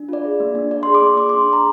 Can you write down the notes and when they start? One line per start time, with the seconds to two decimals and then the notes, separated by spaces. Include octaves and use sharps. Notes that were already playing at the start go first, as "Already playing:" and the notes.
Already playing: D4
0.09 F4 D5
0.24 G#4
0.40 A#3
0.55 D4
0.71 F4 D5
0.83 G#4 C6
0.95 D6
1.02 A#3
1.17 G#4 D6
1.29 D4 C6
1.49 G#4 A#5